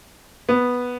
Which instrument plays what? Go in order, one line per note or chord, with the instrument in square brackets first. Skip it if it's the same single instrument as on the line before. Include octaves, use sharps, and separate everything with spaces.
[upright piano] B3